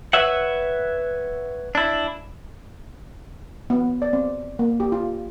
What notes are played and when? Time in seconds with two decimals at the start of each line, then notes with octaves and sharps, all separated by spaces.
0.13 B4 C#5 E5 F#5
1.75 D4 E4
3.70 B3
4.02 D5
4.13 C4
4.59 A#3
4.80 G4
4.92 F4